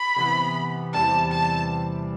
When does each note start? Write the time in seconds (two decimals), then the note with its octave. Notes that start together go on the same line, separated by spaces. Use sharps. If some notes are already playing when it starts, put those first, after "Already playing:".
Already playing: B5
0.16 C3 E3 B3
0.93 E2 C3 E3 G3 C4 A5
1.32 A5